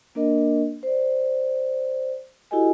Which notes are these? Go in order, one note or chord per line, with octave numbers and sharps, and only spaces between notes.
A#3 D4 A#4 D#5
C5 D5
E4 F#4 G4 A4 D#5 G#5